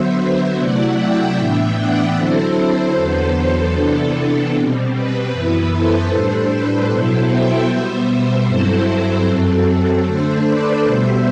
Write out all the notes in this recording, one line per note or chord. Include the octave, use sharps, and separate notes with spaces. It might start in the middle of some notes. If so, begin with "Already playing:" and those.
Already playing: D3 F#3 B3 C5 E5
C3 F#3 A3 E4 D5 F#5
E5 G5
A2 E3 B3 D4
D5 F#5
D3 F#3 C4 E4 A4 C5
A4 C5
E2 D3 F#3 B3
C3 E3 B3 D4 A4
B2 G3 C4
B4
F#2 E3 B3 E4
A4 C5
A2 G3 D4 A4 C5
B4
B2 F#3 B3 E4 A4 C5
E5 G5
B2 G3 B3 C5 E5
G2 F#3 C4 E4 A4 C5
F#2 F#3 C4 A4
D3 A3 D4 A4 C5
B4 D5
B2 G3 B3 C5 E5